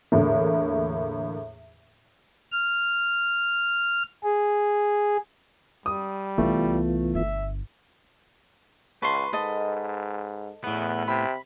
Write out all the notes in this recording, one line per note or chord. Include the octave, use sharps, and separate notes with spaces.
E2 A2 D3 A#3
F6
G#4
G3 D#6
C2 E3 A3 B3 F4
G1 E5
C#2 B4 A5 C6 C#6
G#2 A4 D#5
E2 A2 B3
C3 B5